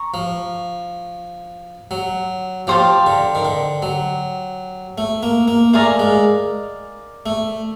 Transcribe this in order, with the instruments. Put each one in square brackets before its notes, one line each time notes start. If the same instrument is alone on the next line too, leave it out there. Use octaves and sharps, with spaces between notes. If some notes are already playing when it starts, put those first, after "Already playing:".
Already playing: [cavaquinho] A#5 C#6
[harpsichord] F3
F#3
[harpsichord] F3 [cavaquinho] G4 C5 F5 A5
[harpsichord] D3
D#3
D3
F#3
A3
A#3
A#3
[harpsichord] A3 [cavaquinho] A#4 D5 F5 G#5
[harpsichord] G#3
A3